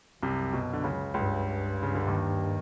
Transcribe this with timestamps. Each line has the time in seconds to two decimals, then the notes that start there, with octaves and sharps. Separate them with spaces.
0.22 C2 F#2 C3
0.53 B1 B2
0.73 D3
0.84 C#2 C#3
1.14 C#2 G2 C#3
1.83 C#3
1.95 D3
2.07 D#2 D#3